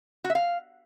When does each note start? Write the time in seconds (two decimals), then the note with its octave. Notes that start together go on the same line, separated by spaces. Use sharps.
0.24 F#4
0.30 E5
0.35 F5